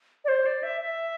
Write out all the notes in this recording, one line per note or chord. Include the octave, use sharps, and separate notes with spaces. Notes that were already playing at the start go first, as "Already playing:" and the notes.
D5
C5
D5
E5
E5